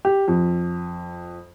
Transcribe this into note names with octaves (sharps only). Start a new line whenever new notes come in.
G4
F2